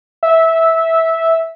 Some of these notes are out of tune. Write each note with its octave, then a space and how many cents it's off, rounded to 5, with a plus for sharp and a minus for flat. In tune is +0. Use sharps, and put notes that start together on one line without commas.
E5 -10